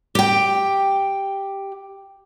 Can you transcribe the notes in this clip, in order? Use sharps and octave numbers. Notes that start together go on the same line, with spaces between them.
G4 G5